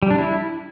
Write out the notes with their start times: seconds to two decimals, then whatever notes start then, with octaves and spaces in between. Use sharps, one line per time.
0.03 G3
0.10 D4
0.18 E4